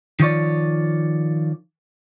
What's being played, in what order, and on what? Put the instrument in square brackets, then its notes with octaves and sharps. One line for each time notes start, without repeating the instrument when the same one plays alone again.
[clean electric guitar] D#3 F3 C#5 D5